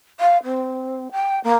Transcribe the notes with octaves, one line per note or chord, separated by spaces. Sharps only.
F5
C4
G5
A#3